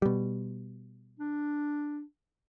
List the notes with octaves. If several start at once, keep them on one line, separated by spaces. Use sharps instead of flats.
B2 G3
D4